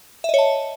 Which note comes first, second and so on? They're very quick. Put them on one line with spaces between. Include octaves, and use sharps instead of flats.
E5 D#5 C#5 A5